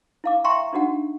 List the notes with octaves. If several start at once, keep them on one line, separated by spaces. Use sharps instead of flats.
E4 F5 D6
E5 G5 A#5 C6 C#6
D4 D#4 F#4 F#5